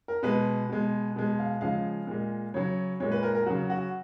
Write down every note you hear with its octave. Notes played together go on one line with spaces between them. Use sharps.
A#4
B2 G#3 B4
B2 G#3
B2 G#3
F5
C#3 F3 G#3 F5
A#2 G#3
C#3 F#3 C#5
A#2 G#3 C#5
B4
A#4
A#4
C#3 F#3 F#4
F#4